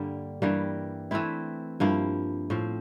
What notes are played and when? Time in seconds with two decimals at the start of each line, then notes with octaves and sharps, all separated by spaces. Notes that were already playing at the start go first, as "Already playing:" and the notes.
Already playing: G2 D3 G3 A#3
0.42 G2 E3 G3 A#3
1.11 E3 A3 C4 E4
1.80 G2 F3 A#3 E4
2.50 A2 F3 C4